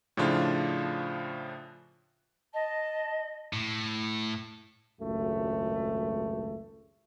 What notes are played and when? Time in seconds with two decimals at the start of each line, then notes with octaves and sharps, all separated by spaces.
0.17 A2 C#3 F3 D4 F4
2.54 D#5 A5
3.53 A2
5.01 G#1 C#2 F#2 A3